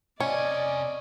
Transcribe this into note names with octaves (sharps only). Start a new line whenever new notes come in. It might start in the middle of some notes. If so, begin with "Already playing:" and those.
C3 C#4 D5 D#5 G#5